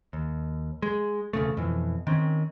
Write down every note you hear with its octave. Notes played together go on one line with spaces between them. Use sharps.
D#2
G#3
E1 C#3 A3
F2 B2 E3
D#3 C4 C#4